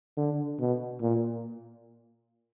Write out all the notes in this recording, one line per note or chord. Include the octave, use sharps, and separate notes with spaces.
D3
B2
A#2